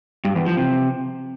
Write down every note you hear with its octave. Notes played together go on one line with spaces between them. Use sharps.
G2
E2
F3
C3